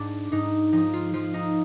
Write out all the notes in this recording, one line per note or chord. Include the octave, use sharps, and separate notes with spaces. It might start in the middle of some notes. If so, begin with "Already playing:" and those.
Already playing: G#2 D4
G#2 D#4
F3 D#4
F4
F3 F4
D#4